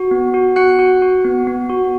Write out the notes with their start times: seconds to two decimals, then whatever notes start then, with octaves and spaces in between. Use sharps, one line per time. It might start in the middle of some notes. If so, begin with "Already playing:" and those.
Already playing: F#4
0.11 B3
0.34 F#4
0.56 F#4 F#5 F#6
0.79 F#4
1.02 F#4
1.25 B3
1.47 B3
1.70 F#4